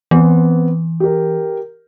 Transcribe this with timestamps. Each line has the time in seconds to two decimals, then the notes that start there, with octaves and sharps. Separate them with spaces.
0.11 E3 B3 C4
1.00 G4 A#4